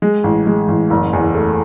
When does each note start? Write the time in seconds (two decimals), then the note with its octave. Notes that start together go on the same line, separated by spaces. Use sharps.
0.02 G#3
0.24 A1
0.47 G#3
0.68 A1
0.90 F#1
1.13 E2
1.35 A3